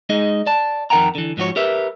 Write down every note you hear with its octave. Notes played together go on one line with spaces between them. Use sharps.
G#3 D#4 G#4 D#5
D5 A5
F2 D#3 A#4 F#5 G5 A#5
D3 E3
G#2 F3 F#4 C#5
G4 A#4 B4 E5